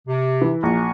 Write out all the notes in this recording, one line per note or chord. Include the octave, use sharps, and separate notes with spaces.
C3
E3
A#1 G#5 A#5 C#6